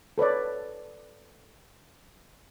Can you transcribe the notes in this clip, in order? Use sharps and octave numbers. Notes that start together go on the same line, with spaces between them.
A4 B4 C#5 D5